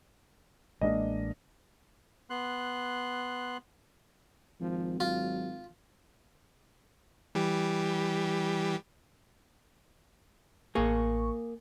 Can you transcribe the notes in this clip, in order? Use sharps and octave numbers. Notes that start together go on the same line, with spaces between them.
A1 G#3 A#3 D4 D#5
B3 C6 F#6
G#1 F3
F#3 F4
E3 G3 G4
A1 A#3 G#4 C#6